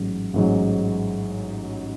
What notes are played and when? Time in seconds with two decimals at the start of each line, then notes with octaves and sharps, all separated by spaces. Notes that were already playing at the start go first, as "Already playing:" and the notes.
Already playing: A1 G#2 F#3
0.34 A1 G#2 F#3